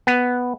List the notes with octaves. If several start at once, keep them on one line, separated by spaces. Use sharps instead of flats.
B3